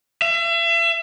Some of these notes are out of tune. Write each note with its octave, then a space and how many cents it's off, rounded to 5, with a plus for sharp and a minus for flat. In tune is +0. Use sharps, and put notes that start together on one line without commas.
E5 +35